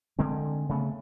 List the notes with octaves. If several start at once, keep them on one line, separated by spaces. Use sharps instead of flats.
D3 G#3 C4
C#3 A3 B3